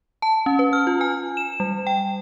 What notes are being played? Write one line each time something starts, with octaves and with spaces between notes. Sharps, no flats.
A5
C#4
B4
F6
F4
G#5
E7
G3
G5